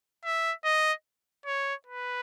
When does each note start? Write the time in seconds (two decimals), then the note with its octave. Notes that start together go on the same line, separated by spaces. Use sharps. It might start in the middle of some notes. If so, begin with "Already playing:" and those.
0.25 E5
0.65 D#5
1.46 C#5
1.87 B4